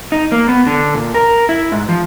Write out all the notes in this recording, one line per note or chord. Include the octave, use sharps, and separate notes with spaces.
D#4
A#3
B3
D3
A#2
A#4
E4
G#2
F3